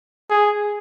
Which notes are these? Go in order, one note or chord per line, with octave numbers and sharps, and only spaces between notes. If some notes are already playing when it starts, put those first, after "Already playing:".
G#4